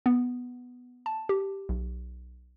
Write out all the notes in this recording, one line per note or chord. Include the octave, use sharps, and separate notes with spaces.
B3
A5
G4
B1